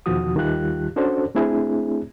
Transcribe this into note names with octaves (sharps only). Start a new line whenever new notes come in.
E2 B2 D#3 F3 F#4 D#6
D#2 D#3 G3 F4 G4 F#6
C#4 D4 F#4 A4 C5 D5
A3 C4 D4 E4 G#4